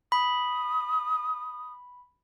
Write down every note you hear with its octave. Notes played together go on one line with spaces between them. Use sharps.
B5 D#6